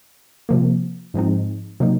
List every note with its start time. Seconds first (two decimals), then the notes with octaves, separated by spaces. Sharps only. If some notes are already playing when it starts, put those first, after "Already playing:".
0.49 C3 F3 A#3
1.14 G#2 F3 G#3 C4 D#4
1.80 C3 F#3 A#3 D#4